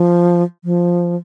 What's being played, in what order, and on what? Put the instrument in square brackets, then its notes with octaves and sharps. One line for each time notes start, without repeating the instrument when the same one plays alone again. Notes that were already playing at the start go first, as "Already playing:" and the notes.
Already playing: [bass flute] F3
F3